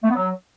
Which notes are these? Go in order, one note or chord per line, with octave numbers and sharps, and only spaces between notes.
A3
B3
F#3